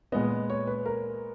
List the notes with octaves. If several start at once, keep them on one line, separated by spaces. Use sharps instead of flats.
A#2 G#3 B3 D#5
C#5
B4
A#4